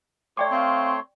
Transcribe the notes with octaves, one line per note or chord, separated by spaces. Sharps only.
A3 C#5 D5 G5 C6 D6
C4 F5